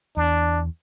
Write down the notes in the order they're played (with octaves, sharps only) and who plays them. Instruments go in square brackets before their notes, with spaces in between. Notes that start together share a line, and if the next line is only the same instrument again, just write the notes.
[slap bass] E2 [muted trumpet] D4